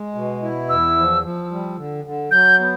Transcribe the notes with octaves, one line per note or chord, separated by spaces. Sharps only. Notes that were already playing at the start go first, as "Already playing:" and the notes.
Already playing: G#3
B2
E4
E2 E6
F3
F3
G3
D3
D3
F#3 G6
B3